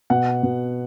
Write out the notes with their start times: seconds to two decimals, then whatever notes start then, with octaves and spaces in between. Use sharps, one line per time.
0.10 B2 F#5
0.43 B2